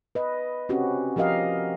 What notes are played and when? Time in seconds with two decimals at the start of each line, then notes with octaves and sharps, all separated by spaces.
0.15 B4 D#5
0.69 C4 C#4 F#4 G4
1.16 F3 G4 A#4 D#5 F5